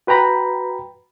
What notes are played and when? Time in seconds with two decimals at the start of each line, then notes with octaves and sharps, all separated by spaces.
0.07 F#4 B4 G5 A#5 B5